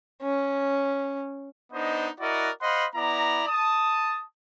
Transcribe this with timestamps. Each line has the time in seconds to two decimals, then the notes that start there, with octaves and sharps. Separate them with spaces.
0.22 C#4
1.73 B3 D4 D#4 C5 D#5
2.20 E4 F#4 A#4 D5 D#5 F#5
2.62 C5 D#5 F5 F#5 B5 C6
2.95 B3 E4 D5 A#5
3.48 A5 D#6